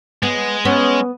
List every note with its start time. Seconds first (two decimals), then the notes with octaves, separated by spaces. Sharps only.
0.23 G#3 B3
0.65 B3 C#4